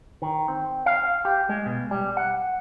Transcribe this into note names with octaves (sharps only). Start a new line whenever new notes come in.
D#3
C4
F5
G4
G#3
B2
G3
F#5